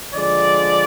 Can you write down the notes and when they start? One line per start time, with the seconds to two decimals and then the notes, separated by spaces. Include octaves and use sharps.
0.14 D3 F3 G#3 D5